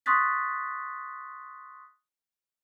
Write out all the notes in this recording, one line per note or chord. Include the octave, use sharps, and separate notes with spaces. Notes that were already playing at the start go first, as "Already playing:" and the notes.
C6 C#6 D#6 F#6 A6 B6